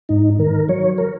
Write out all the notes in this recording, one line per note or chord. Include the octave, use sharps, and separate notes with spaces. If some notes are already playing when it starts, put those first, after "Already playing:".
G#2 D#4
D#3 A#4
F#3 C#5
A#4